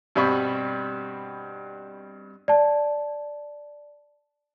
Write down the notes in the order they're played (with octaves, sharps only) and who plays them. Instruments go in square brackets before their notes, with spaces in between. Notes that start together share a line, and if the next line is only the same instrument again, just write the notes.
[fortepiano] G2 B2 G3 C4 B5 C#6
[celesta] D5 A5